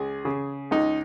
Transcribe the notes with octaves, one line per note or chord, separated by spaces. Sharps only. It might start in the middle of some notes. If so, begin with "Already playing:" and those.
Already playing: C#2 G#4
C#3
C#2 D#4